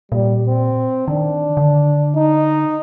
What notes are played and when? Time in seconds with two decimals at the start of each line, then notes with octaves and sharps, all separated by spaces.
0.12 A#2 G3
0.47 C4
1.08 D#3 D4
1.57 D3
2.16 D#4